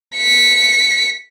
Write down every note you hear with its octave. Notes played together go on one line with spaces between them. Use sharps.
B6 C#7